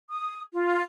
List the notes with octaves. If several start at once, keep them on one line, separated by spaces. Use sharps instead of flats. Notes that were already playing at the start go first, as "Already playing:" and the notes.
D#6
F4